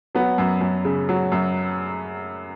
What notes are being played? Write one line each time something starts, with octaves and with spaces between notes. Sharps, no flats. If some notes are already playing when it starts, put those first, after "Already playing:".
F#3 B3
F#2
F#2
C#3
F#3
F#2